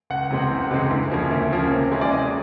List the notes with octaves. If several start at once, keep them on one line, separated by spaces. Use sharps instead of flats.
C#2 F#5
C3 E3 G#3 C4
C#2
C3 E3 G#3 C4
D2
C#3 F3 A#3 C#4
D2 E5
C#3 F3 A#3 C#4
C3
E3 G#3 C#4 E4
D5
C3 D#5